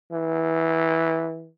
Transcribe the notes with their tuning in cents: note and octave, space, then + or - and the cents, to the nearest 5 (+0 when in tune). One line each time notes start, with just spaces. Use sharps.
E3 -15